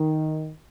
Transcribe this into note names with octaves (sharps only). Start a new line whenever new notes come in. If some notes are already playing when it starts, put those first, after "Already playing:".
Already playing: D#3